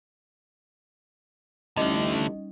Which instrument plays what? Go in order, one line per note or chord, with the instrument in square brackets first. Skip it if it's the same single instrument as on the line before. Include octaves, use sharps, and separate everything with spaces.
[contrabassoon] A1 [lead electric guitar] D3 A3 [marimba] G3 C#4 D#4 [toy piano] D#5